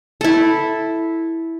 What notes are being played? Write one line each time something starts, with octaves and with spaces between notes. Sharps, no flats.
E4 A4